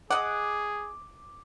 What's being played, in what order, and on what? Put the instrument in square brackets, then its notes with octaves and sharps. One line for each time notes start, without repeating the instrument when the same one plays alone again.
[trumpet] G#4 [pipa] D#5 F#5 [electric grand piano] D6